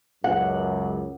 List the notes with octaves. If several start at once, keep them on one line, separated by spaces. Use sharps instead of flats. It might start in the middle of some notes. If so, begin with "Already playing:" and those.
C#2 F#2 F#5